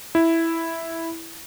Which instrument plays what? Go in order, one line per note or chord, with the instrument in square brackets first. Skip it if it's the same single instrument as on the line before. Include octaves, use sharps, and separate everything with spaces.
[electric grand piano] E4